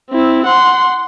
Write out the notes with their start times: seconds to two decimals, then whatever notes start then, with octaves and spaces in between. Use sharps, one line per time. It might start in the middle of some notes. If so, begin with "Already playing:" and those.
0.10 C4 E4
0.46 F#5 C6